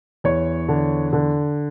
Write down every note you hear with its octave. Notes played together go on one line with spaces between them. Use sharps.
E2 C#5
D3
D3